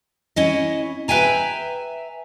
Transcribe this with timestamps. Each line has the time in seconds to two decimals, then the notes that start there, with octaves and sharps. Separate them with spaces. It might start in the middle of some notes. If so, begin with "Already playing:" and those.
0.36 C#4 E4 D#5
1.08 B4 E5 G5 G#5 A#5